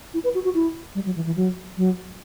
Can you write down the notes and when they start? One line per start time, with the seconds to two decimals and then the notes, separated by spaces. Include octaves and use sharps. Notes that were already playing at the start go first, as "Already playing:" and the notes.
0.14 E4
0.24 B4
0.34 F#4
0.45 F#4
0.55 E4
0.95 G3
1.05 F#3
1.16 E3
1.26 E3
1.36 F#3
1.77 F#3